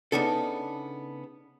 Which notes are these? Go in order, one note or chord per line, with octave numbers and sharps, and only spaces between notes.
C#3 F3 B3 D4 D#4 A4